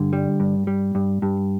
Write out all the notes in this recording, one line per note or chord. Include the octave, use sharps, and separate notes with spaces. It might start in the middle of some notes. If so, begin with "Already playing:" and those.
Already playing: G2 D3
G3
G2
G3
G2
G2